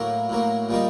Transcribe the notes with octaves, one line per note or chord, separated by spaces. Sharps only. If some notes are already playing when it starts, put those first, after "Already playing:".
Already playing: A2 F#3 A#3
A2 F#3 A#3
A#2 G3 A#3 D#4